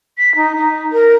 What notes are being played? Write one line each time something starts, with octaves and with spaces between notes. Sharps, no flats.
B6
D#4
D#4
A#4